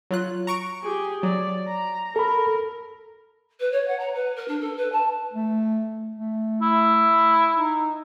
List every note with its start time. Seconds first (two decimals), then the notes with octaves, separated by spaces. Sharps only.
0.11 F#3 F4 F#6
0.47 A#5 C#6 D7
0.83 G4 G#4
1.23 F#3 D5
1.67 A#5
2.16 A4 A#4 B5
3.60 B4
3.72 C#5
3.88 F#5
3.99 A#5
4.14 B4
4.36 A#4
4.48 D4
4.61 A4
4.77 B4
4.92 A5
5.33 A3
6.16 A3
6.62 E4
7.57 D#4